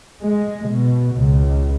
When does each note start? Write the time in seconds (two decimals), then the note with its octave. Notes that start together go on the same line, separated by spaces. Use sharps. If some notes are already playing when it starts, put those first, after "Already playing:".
0.21 G#3
0.71 B2
1.15 C#2